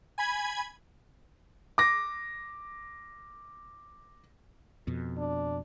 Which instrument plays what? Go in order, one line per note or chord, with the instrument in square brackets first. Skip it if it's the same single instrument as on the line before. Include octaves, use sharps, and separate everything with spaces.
[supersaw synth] G#5 B5 G#6
[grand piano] D6 A#6
[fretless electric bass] F2 B2
[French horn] D4